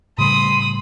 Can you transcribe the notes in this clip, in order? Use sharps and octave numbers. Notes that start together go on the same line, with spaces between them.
A2 C#3 G3 B5 C6 D#6